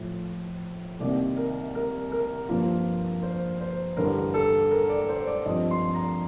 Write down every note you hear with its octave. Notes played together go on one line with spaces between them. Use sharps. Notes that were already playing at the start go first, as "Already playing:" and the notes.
Already playing: A2 F3 F4
C2 C3 D#3 G3 A#3 D5
A#4
A#4
A#4
G2 F3 A#3 F4
C5
C5
A1 G2 D3 G3 A#4
A4
A#4
D5
C5
D5
G2 F3 C4 D#5
C6
A#5